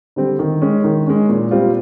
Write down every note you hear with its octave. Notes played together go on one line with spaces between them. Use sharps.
D3 G3 C4
D#3
G#3 C#4
D#3
G#3 C#4
A#2
G3 C4 F4